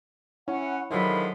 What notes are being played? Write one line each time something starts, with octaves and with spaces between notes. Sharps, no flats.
C#4 E4 F#5
D3 D#3 F3 F#3 G#3 E5 B5